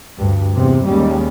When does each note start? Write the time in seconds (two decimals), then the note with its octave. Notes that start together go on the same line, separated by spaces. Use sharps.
0.17 D2 G2
0.56 E2 C3
0.87 D#2 G3 G#3 C#4